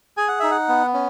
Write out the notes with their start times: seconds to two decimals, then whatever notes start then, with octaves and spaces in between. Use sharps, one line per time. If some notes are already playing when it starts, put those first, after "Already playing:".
0.17 G#4 G#5
0.28 F#5
0.40 D#4 E5
0.51 F#5
0.69 B3
0.94 C#4